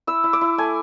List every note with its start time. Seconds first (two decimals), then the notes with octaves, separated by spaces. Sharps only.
0.07 E4 E6
0.24 E4
0.33 D6
0.41 E4
0.58 A3 G#5